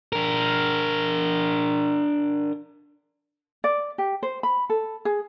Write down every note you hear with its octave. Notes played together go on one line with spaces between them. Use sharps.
D4 A#4
D5
G4
C5
B5
A4
G#4